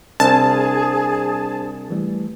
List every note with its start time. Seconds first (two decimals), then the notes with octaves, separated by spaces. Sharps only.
0.20 C2 D4 G#4 C5 A5
1.90 E3 G3 A3